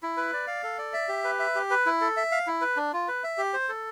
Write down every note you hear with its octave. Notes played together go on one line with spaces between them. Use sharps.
E4
B4
D5
F5
A4
D5
E5
G4
B4
E5
G4
B4
E4
A4
E5
F5
E4
B4
D4
F4
B4
E5
G4
C5
A4